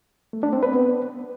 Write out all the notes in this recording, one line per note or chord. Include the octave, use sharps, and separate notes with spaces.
A3
D4
C4
B4
B3